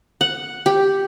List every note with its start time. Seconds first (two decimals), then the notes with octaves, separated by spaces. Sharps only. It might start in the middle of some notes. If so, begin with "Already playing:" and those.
0.21 F#5
0.66 G4